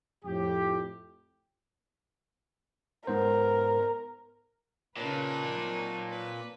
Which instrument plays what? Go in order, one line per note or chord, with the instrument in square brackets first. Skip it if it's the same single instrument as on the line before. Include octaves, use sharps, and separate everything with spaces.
[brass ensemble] F2 A2 G4
[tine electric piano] G#2 B3 C5 [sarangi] A#4
[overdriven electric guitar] A#2 [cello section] C#3 B4 [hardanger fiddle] D4 D#4
[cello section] F#3 C4
[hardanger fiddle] B4